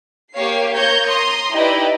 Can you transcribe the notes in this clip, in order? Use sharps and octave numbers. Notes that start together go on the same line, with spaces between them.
A#3 G4 C#5 F5 C7
A#3 C#5 A#5 G6 G#6 C#7
A#5 C6 D#6
D#4 E4 G4 B4 D5 D#5